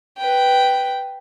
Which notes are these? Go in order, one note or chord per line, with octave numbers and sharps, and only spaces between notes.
B4 G5